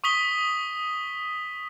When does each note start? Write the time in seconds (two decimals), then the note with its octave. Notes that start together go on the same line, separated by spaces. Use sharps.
0.04 C#6 D#6 B6 G7